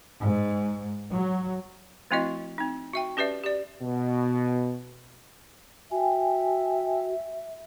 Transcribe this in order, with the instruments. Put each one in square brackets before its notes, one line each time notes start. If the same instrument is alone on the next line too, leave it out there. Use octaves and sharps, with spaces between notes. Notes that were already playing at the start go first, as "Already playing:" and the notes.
[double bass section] G#2
F#3
[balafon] F3 A3 C4 E4 F#4 D#5
C4 D#4
F#4 E5 G5
C#4 G4 B4 D5 E5
G4 D5
[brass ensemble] B2
[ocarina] F#4 [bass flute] E5 [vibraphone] G5 G#5